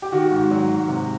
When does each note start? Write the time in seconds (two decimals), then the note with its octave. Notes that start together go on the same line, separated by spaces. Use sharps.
0.02 G4
0.12 D#3 F#4
0.31 G#2
0.51 F#3
0.69 G#2
0.88 C3